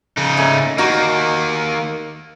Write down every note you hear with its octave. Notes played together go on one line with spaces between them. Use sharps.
C#3 D#4
A3 A#3 C#4
D#3 A#3 D#4 F#4